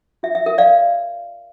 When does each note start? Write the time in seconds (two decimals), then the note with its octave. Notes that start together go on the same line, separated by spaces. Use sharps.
0.23 F4 E5
0.35 E5
0.46 A#4 E5
0.58 D5 F5